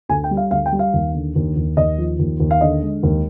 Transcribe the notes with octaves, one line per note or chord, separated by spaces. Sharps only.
D2 G#5
G5
G3
F5
D2 F5
G5
G3
F5
D#2
D3
D#2
D#2
D#2 D#5
F3
D#2
D#2
F5
D3 D#5
G#3
D#2